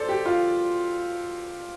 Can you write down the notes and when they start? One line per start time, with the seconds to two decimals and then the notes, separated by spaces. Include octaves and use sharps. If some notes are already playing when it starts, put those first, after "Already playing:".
Already playing: A4 C5 D5
0.09 G4
0.26 F4